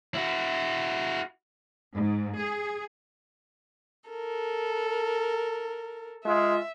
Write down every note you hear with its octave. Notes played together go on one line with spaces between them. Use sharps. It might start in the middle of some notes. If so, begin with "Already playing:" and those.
E4 F#4
G#2
G#4
A4 A#4
G#3 F4 E5